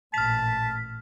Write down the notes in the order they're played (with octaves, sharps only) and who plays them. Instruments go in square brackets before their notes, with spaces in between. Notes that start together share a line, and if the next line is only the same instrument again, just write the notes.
[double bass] A1 A#2 [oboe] A5 [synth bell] F6 B6